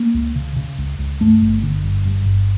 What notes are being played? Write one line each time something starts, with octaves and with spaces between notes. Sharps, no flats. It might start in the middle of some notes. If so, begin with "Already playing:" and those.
Already playing: A#3
C#2
C#3
C#3
C#2
C#2
G2 A3
G1
D3
G1
G2
G1